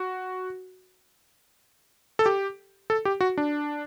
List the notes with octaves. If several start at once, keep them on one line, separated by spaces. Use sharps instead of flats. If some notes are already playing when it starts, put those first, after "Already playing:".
Already playing: F#4
A4
G4
A4
G4
F#4
D4